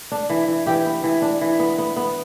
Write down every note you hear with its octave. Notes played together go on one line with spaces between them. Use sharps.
D4
E3
E3
E3 G4 G5
B3
E3
D4
E3
B3
B3
B3